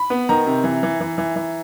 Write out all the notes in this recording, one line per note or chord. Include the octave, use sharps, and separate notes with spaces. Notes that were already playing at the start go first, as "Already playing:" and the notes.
Already playing: B5
B3
D#3 A#5
C3
E3
E3
E3
E3
E3